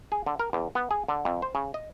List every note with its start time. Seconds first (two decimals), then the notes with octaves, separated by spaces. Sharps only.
0.12 G#4
0.26 D3
0.39 A#4
0.53 E2
0.75 B3
0.91 G#4
1.08 D3
1.25 F2
1.42 C5
1.55 C#3
1.74 D#5